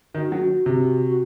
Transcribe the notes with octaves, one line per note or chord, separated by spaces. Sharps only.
D#3 F#4
F#3
C3
F#4